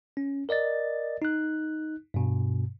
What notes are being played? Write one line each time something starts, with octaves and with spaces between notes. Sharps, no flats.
C#4
A#4 D5 D#5 A6
D#4 F#6
G2 B2